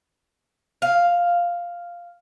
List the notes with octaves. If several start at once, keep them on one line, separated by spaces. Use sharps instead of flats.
F5